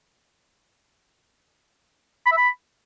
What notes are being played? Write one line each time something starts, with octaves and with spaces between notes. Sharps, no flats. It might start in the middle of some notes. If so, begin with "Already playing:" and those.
B5
E5
B5